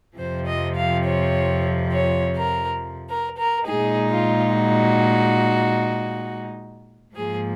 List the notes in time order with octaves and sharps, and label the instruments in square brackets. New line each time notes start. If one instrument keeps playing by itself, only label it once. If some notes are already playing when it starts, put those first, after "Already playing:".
[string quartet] F2 C3 F3 C5
D#5
F5
C#5
C#5
A#4
A#4
A#4
A#2 G#3 D#4 G#4
F4
F#4
G#2 F3 A#3 G#4